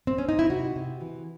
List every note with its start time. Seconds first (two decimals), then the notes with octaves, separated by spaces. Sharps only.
0.07 C4
0.18 C#4
0.29 D#4
0.39 E4
0.50 C3 F#4
0.76 C3
1.01 E3